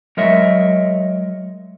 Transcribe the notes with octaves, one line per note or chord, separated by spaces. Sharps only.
F#3 G#3 A#4 C#5 D#5 E5